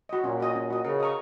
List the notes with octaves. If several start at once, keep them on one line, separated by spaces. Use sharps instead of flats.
F#4 D#5
A#2 C#4
F#4 D#5
C#4
F#4 D#5
C#3 A#4
D#5 A#5 C#6